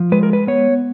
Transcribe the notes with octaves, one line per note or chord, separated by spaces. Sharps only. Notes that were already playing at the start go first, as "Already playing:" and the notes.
Already playing: F3
G#3 B4
A#4
B4
B3 C#5